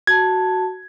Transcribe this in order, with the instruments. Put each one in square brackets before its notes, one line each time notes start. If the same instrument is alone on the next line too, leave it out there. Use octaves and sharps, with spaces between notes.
[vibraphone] F#4 A5 [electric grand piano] G#6